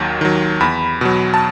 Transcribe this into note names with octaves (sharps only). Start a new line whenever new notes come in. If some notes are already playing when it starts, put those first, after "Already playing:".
Already playing: D#2 D#3 F#3
D#3 F#3
E2 B5
B2 F#3
A5